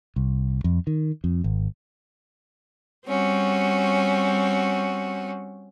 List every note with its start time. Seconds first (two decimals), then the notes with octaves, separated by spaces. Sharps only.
0.16 C2
0.64 F2
0.87 D#3
1.24 F2
1.44 G#1
3.05 G3 C4 C#4 F#4